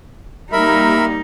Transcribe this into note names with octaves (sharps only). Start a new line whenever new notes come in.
G3 A#3 D#4 A#4 E5 B5